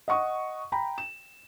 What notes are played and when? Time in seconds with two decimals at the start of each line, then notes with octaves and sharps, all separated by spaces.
0.08 D#5 F#5 C#6 D#6
0.72 G5 A#5 B5
0.98 E7